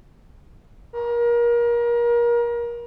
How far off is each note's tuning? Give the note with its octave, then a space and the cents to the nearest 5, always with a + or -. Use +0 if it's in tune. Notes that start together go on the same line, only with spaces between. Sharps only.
A#4 +30